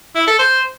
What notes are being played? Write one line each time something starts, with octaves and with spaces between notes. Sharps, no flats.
E4
A4
C5